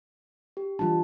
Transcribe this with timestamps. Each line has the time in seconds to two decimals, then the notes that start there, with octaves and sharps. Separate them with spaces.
0.57 G4
0.79 E3 G3 D4 F4 A5